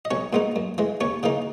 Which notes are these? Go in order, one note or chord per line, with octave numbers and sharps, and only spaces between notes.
D#5
B1 C#4 C#5
A#2 G#3 B3 D#4
F#2
E3 G#3
D#2 C#4 C#5
C#3 E3 A#3 D#4